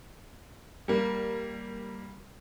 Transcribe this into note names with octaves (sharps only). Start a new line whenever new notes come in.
G3 A#3